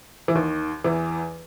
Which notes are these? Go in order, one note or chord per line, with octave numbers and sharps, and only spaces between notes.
E3
D#2 D#3
E2 E3